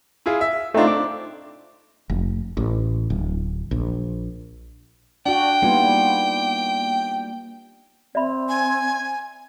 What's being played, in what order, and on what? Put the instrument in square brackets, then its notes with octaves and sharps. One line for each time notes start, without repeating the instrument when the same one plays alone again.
[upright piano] E4 F4 G#4
E5
[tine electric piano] A3 D#4 F4 [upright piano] C4 D4
[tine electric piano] D6
[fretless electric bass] F1
A1
D1
A#1
[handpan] D4 F#4 [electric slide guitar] D5 [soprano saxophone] G5
[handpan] G3 B3 F4 [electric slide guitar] A#3 D#4
[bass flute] C4 [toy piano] D5 E5 B5
[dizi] G#5